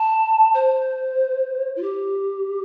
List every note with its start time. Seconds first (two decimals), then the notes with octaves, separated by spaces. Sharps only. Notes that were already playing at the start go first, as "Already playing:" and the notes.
Already playing: A5
0.54 C5
1.76 F4
1.82 G4